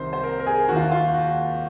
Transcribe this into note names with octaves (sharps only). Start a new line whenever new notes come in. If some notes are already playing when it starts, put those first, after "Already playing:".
Already playing: C2 C3 D#3 C5
C5
A#4
A#4
G#4
D#2 D#3 F#4
F4
F#4
F4
F#4